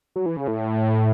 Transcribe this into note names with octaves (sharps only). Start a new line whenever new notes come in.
F#3
E3
C#3
A2